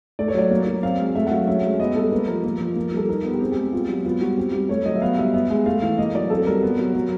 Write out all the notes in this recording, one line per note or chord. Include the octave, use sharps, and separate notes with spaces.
A3 D5
C#5
F#3 D5
A#3
F#3
C4 F5
G#3
A3 E5
F#5
F#3 F5
C#4 E5
G#3
B3 D#5
G3 A4
A#3 B4
F3 A#4
A#3
F3
A#3
G3 A4
D#4 A#4
B3
G4
C4 G#4
G4
G#3
B3 F4
F#3
B3 F4
G3 F#4
C4 G4
G3
A3 C#5
F#3 D#5
E5
B3 F5
G3 E5
B3 E5
G#3
A3 F5
E3 F5
A#3 D#5
F#3 D5
C4 A4
G3 A#4
B3
F#3
F#3